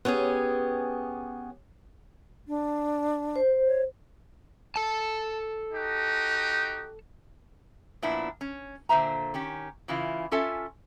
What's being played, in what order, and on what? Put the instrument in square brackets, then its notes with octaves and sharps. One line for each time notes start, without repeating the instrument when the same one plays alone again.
[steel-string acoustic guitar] B3 C#4 G4 G#4
[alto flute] D4
[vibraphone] C5
[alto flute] C#5
[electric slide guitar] A4 A5
[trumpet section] D#4 F#4 G4
[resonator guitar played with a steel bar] A#2 F3 B3 D4 E4
C#4
A#2 D3 C5 E5 A#5
D#3 C#4 G4
C#3 E3 E4 F4
C#4 F4 A4 E5 G#5